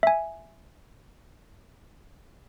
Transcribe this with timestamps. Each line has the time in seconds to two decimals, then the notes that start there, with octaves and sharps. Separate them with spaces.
0.03 E5 G#5